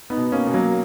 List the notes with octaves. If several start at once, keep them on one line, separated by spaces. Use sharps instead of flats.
B3 D#4
B2
A#3 C#4
B2
F#3 A#3